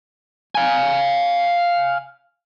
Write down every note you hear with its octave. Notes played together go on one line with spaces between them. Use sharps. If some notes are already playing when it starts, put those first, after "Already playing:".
F5 G#5